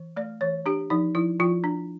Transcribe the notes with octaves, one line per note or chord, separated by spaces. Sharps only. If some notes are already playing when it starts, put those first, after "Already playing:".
Already playing: E3
A3 D5
E3 C#5
D4 G4
F3 D#4
F3 E4
F3 F4
D4